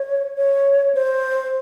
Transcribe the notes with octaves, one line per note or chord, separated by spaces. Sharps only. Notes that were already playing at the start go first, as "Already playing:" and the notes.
Already playing: C#5
C#5
C5